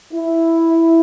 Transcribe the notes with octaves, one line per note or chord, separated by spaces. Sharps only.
E4